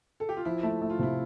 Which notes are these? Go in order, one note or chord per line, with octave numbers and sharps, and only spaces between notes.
A4
G4
F4
F3 E4
A3
A3
F4
C3 E4